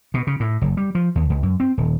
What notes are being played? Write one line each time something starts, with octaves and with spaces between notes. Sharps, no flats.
B2
C#3
A2
F#1
G3
F3
D#2
C#2
F#2
C4
D#1